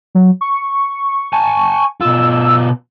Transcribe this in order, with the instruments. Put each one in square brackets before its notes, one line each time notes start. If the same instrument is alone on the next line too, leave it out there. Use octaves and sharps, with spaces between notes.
[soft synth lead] F#3
C#6
[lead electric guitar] G#5 A5
[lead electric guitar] B2 F4 [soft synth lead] E6